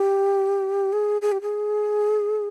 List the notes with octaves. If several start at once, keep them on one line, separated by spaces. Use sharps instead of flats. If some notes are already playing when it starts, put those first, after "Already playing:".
Already playing: G4
G#4
G#4
G4
G#4